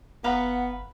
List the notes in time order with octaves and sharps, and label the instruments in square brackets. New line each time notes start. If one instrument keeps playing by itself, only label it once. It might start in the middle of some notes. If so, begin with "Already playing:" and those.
[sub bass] F#1 [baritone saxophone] B3 [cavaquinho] B4 F5 A#5 [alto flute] F#5